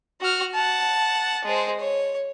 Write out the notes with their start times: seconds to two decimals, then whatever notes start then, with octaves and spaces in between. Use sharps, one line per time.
0.21 F#4 F6
0.55 F#5 A5
1.45 G#3 C5
1.80 C#5